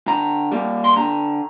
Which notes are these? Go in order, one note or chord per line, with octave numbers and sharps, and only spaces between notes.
D3 A#5
G3 A#3
C6
D3 A#5